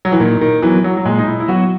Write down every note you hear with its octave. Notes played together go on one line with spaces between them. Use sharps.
F#3
E3
A#2 D#3
D#3
E3 F#3 B3
F#3
F#3
A#2 G#3
D#4
E4
E4
F#3 B3 F#4